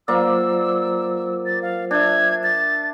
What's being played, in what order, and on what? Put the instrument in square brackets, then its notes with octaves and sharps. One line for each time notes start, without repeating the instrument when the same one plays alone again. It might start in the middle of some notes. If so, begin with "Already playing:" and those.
[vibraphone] F#3 F4 C5 [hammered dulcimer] A#3 D5 [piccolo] E6
[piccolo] A6
F5
[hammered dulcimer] D4 E5 [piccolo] G#6
[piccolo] A6